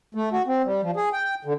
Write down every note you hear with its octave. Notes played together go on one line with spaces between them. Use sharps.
A3
F#4
C4
G3
F3
G#4
G5
D3